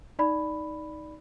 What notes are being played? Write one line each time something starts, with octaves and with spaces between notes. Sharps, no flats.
D#4 D5 B5